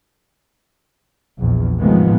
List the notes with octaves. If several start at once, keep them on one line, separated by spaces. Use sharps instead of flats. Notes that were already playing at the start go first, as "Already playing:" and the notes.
A#1 E2
A2 C3 D#3 F3 G#3 B3